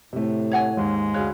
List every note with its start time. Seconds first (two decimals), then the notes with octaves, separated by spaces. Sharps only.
0.13 A2 C3 A3
0.52 C#5 F#5 G#5
0.77 D#2 G#2 G#3
1.14 D2 G#4 C#5 F5 F#6